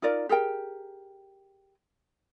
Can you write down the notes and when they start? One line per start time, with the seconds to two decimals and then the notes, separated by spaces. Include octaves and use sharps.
0.02 D#4 F4 A#4 D5
0.29 G4 G#4 A#4 G5